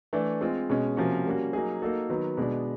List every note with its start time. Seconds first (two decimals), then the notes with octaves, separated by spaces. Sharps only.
0.13 E3 A3 D4
0.41 G#3 C4 F4
0.70 B2 G#3 C#4
0.97 C3 F3 A#3 C#4 F#4
1.26 G3 A#3 C#4 F#4
1.53 F#3 A#3 D#4 G#4
1.82 A#3 D#4 F#4 A4
2.09 D#3 F#3 B3
2.37 B2 G#3 B3 D4